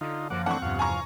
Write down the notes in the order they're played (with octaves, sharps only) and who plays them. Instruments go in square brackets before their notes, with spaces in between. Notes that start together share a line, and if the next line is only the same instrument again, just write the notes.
[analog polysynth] D3 [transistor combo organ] D#4 F4
[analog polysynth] F#2 F3 A#3 [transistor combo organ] F#5 D6
[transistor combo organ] E3 A3 D4 [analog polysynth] C4 [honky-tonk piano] F#5 C#6
[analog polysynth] E2 G2 C3 [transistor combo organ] F3 F5
[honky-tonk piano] G#5 A#5 C#6